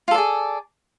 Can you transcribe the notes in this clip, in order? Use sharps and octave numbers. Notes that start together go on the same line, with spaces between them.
F4 G#4 A4 D5